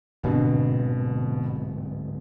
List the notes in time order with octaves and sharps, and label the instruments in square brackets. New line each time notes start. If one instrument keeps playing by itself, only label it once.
[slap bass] D1 G#2 C4 [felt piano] B2 D3